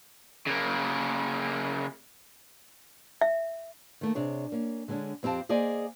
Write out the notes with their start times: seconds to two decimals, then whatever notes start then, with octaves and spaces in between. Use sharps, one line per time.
0.46 C#3 A#3
3.21 E5
4.01 D#3 A3 A#3
4.15 C3 D4 G#4 C#5
4.52 A#3 C#4
4.88 D3 G#3 B3 C#4 D4
5.23 F2 C4 G4 F5 A5
5.49 A#3 G#4 C5 D5 D#5 G#5